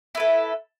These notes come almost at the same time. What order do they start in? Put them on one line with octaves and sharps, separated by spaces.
E4 B4 A4